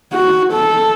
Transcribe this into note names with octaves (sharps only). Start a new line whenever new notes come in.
F#4
A4